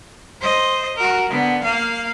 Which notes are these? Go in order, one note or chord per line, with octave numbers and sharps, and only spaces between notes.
C5 D#5
F#4 A#4
D3 B3
A#3 F5